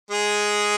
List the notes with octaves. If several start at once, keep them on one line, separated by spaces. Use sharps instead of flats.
G#3 G#4